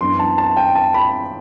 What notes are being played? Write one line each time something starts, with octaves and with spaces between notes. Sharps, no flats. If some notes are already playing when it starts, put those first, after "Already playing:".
F#2 E3 B3 D4 C6
A5
A5
G5
A5
B5